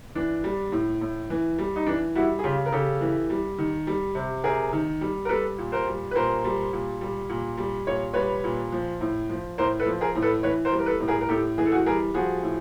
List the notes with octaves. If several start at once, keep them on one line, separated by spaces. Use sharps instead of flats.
E3 D4
G3
A2
A2
E3
G3
D#4
E3 D4
G3 E4 F#4
G#4
C#3 F4 G4
A#4
C#3 G4 A4
E3
G3
D#3
G3
C3
C3 G#4 A#4
D#3
G3
A#4
G3 A4 B4
A#2
A#4 C5
G3
B4
A#2 A#4 C5
G3
A#2
G3
A#2
G3
A#2 C#5
G3 B4 C#5
A#2
F3
A2
F3
A2 A#4 C5
A4 B4
F3
G#4 A#4
A2
A4 B4
E3 B4 C#5
A#4 C5
G3
A#4
A4 B4
A2
G#4 A#4
A#4
A2 G4 A4
E3 G#4
A4
F#4 G#4
G3 G#4 A#4
F3 F#4 G#4
A2